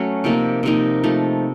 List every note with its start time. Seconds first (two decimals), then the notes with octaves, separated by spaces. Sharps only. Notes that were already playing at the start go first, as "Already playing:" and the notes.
Already playing: F#3 A3 C#4
0.24 C3 F3 A#3 D#4
0.63 C3 F3 A#3 D#4
1.04 F3 A3 D#4